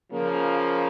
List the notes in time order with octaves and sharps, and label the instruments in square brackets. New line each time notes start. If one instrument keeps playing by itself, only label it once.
[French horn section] C#3 F3 A#3